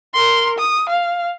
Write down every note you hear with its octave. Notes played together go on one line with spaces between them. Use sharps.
A#4 C6
D#6
F5